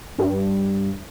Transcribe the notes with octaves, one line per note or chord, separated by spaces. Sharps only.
G2